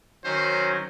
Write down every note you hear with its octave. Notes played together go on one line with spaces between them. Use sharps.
D#3 F#3 C#4 C5